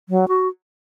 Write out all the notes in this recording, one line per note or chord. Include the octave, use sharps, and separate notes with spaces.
F#3
F#4